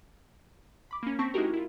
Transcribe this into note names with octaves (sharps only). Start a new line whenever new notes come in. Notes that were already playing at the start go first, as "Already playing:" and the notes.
B5 D6
A#3 C#4
C4 A5 C#6 A#6 B6
G#3 D#4 E4 F#4 G4 A#4
E4 F4